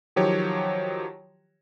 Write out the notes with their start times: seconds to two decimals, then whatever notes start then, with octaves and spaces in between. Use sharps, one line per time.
0.16 D#3 F3 F#3 G4 C#5